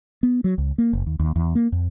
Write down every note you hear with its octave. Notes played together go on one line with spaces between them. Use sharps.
B3
F#3
C#2
A#3
F#1
D#2
D#2
E2
A#3
F2